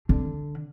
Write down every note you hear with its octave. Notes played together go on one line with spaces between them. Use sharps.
D3